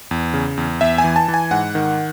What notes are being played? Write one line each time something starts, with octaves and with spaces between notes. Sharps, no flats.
E2
C#3
E2
E2 E5
G#5
E3
A5
E3
G#5
G#2 F#5
D#3